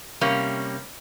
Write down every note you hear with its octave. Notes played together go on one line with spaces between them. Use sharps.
C3 G3 A#3 C#4